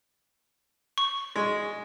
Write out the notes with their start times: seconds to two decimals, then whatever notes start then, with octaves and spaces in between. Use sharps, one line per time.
0.98 C#6
1.36 G#3